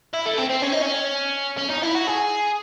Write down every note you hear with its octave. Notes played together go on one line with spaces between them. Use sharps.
E4
A3
C4
C4
C#4
D#4
C#4
C#4
D#4
E4
F#4
G#4